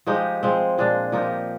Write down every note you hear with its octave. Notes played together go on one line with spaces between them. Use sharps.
F3 G#3 D#4 G4
F3 G#3 C4
A#2 G#3 D4
F3 A#3 D#4 G4